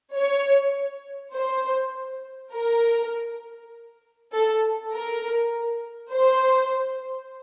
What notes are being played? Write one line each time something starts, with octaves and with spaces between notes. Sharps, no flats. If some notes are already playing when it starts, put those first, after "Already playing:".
C#5
C5
A#4
A4
A#4
C5